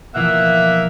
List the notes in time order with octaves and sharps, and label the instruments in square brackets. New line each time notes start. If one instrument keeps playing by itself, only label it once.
[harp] B2 E3 F3 [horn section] A#3 E5 [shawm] F#5